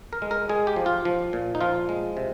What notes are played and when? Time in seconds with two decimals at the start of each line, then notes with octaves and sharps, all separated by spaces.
0.13 A#4
0.22 G#3
0.31 A#4
0.49 G#3 G#4
0.67 G4
0.76 F3
0.86 F4
1.05 F3
1.33 A#2
1.55 D#4
1.61 F3 F4
1.89 G#3
2.17 C3